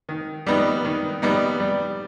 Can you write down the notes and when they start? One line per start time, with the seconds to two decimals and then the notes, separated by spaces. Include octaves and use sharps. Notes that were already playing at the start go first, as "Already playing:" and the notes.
0.09 D#3
0.47 G3 B3 D#4
0.84 D#3
1.22 G3 B3 D#4
1.60 G3